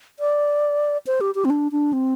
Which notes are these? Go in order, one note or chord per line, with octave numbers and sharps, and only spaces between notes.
D5
C5
G4
G4
C4
D4
D4
C4